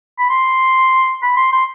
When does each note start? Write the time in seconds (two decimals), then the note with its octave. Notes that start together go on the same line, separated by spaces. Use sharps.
0.18 B5
0.29 C6
1.22 B5
1.36 C6
1.53 C6